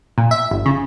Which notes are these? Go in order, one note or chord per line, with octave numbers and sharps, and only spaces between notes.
A#2
E5
G1
C#3